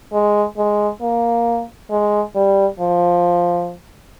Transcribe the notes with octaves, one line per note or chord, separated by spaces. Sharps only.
G#3
G#3
A#3
G#3
G3
F3